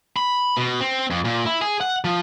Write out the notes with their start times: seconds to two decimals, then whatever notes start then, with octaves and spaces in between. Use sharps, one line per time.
0.17 B5
0.57 B2
0.80 C4
1.11 F2
1.25 A#2
1.46 E4
1.62 G#4
1.81 F#5
2.04 F3